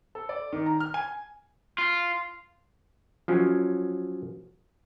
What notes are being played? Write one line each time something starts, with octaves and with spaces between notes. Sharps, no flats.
A4
D5
D#3
A#5
F6
G#5
F4
F3 F#3 C#4